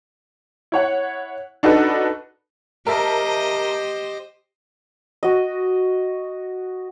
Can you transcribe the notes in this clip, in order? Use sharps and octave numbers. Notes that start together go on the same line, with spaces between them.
E4 C#5 F#5
D4 D#4 F#4 A4 B4
G4 A#4 C5 D#5 E5 A5
F#4 D#5